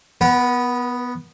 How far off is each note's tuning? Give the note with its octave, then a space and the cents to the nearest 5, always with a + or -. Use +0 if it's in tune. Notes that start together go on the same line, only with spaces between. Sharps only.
B3 +0 B4 -45